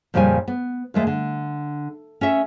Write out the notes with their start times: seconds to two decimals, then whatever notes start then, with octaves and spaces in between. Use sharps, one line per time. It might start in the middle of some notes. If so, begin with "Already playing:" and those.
0.14 F2 A#2 C#3 G3 G#5
0.48 B3
0.94 D#2 G#3 A3
1.07 D3
2.21 C#4 A4 E5